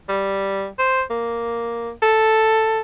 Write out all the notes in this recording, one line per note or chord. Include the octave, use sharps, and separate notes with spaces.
G3
C5
A#3
A4